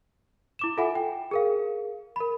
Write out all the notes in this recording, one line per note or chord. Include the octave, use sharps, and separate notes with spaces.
E4 D6 E7
F4 A4 E5 F#5 G#5 B5
G5
G#4 A#4 F5
A#4 B5